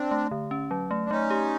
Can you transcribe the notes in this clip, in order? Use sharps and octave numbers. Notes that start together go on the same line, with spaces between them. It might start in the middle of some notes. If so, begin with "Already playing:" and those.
Already playing: C4 D4
A3
D3
C#4
F#3
A3
D4
A3 C#4 D#4
G4